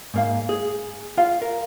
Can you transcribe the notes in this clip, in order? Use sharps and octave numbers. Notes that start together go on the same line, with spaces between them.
G#2 A#3 F5
G#4
F4 F5
A#4